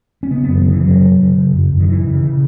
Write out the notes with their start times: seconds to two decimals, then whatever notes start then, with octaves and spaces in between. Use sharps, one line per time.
0.23 C#4
0.30 C#3 B3
0.44 F#2 B3
0.57 D#3
0.65 C#3 E3
0.83 F#2 F#3
1.00 C#3
1.18 C#3
1.35 C#3
1.53 F#2
1.71 F#2
1.80 D#3
1.88 C#3 E3
2.05 C#3
2.23 C#3